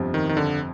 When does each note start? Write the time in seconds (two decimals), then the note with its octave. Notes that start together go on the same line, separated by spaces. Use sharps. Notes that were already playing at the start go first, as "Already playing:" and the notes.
Already playing: G1 F2 C3 F3
0.14 D#3
0.29 D#3
0.37 D3